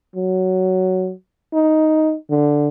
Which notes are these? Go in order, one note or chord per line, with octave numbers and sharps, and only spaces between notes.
F#3
D#4
D3